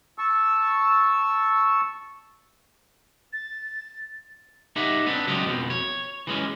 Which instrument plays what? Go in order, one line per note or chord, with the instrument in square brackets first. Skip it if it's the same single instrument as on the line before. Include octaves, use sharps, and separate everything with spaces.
[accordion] A5 C#6 E6
[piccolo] A6
[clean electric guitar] D#4 G4 D#5 E5 F#5
B3 C4 D4
C#3 F#3 G#3 F4 G4 D#5
F2 B2 E3 F3
C#5
E3 G#3 C#4